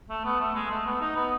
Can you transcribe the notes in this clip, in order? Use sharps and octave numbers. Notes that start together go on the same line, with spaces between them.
A3
B3
A3
G#3
A3
B3
D#4
B3